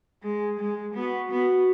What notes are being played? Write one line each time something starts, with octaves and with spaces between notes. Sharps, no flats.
G#3 G#4
G#3
B3 F#4
B3